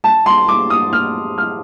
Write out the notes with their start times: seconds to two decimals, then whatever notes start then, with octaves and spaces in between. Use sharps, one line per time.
0.04 A5
0.26 C6
0.48 D6
0.70 D#6
0.93 F6
1.38 F6